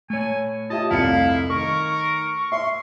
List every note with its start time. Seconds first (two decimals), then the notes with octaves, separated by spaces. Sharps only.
0.10 A3 C#5 G#5
0.70 F4 G4 D#5 E5 A5
0.91 F1 C2 E4 F5 C#7
1.50 D#3 A#4 C#6
2.52 E5 C6